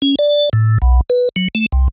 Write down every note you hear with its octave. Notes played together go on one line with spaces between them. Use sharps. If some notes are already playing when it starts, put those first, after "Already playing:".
C#4
D5
A2
B1
B4
F#3
A3
C2